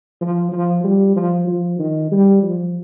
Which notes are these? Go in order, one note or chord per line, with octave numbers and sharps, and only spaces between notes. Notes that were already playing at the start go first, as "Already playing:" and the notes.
F3
F3
G3
F3
F3
D#3
G3
F3